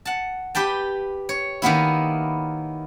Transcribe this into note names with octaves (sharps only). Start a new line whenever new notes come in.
F#5 A5
G4 B4 G5 A5
C#5
D#3 A#3 B3 E4